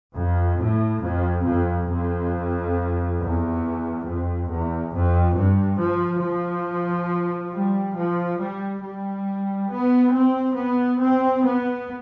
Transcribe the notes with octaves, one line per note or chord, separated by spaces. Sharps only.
F2
A2
F2
F2
F2
E2
F2
E2
F2
G2
F3
F3
G3
F3
G3
G3
B3
C4
B3
C4
B3